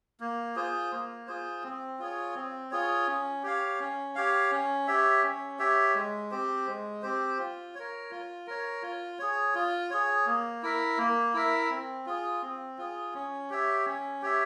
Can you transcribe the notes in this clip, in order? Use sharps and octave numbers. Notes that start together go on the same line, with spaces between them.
A#3
F4 G#4 C5
A#3
F4 G#4 C5
C4
F4 G#4 C#5
C4
F4 G#4 C#5
C#4
G4 C#5 F5
C#4
G4 C#5 F5
C#4
G4 C#5 E5
C#4
G4 C#5 E5
G#3
C4 G4 C5
G#3
C4 G4 C5
F4
A#4 C#5
F4
A#4 C#5
F4
G#4 C#5
F4
G#4 C#5
A#3
E4 A#4 E5
A#3
E4 A#4 E5
C4
F4 G#4
C4
F4 G#4
C#4
G4 C#5 E5
C#4
G4 C#5 E5